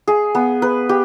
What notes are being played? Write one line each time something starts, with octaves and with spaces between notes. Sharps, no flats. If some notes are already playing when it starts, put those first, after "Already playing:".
G#4
B3
B4
G4